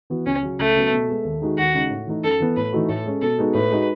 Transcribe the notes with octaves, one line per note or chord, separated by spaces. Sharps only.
E3 B3 F#4
C#2 C#4
C#3 F#3
C#2 A3
C#3 F#3 B3
B2
G#3 B3
D#2
D#3 G#3 D#4 F#4
D#2 F#4
C#3 G#3 D#4
A2
E3 A3 D#4
F#2 A4
E3 B3
A2 B4
E3 A3 D#4 F#4
A2 A4
G#3 C#4
B2 A4
G#3 B3 D#4 F#4
A2 B4
G#3 D#4 F#4